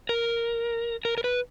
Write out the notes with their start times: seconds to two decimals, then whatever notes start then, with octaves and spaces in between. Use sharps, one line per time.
0.09 A#4
1.05 A#4
1.18 A#4
1.24 B4